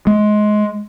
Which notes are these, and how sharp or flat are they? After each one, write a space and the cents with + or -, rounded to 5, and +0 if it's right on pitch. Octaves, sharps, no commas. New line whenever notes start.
G#3 +20